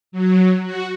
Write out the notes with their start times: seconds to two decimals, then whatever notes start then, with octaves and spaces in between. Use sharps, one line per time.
0.12 F#3
0.64 F#4